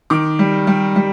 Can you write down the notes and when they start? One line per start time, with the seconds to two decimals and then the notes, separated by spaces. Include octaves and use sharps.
0.10 D#3 D6
0.39 G3
0.67 G3
0.96 G3